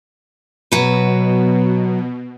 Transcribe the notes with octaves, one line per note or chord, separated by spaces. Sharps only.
B2 F#3 B4